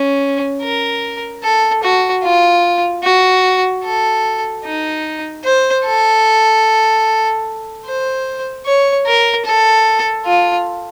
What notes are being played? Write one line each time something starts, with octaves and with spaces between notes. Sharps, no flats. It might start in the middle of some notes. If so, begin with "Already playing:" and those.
Already playing: C#4
A#4
A4
F#4
F4
F#4
A4
D#4
C5
A4
C5
C#5
A#4
A4
F4